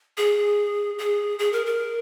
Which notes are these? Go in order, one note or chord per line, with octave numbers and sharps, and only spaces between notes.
G#4
G#4
G#4
A#4
A#4